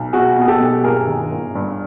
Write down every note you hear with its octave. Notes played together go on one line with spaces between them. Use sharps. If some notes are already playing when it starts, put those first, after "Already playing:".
Already playing: B1
B2 F#4 G#4
B2
G#4
G4 A4
B1
G1 G#4 A#4
D#3
G1
G2